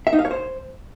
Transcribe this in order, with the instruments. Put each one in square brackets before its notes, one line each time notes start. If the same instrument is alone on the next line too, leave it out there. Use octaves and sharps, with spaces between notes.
[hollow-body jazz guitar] E5
D#4
F5
C#5
C5